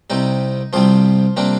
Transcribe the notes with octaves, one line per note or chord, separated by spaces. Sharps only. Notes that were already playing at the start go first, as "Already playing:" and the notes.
C2 C3 G3 D#4
C2 C3 F3 G3 F4
C3 G3 A#3 D4